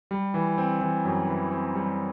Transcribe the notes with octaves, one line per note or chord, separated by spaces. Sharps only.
G3
E3
C4
E3
F#2
E3
C4
G3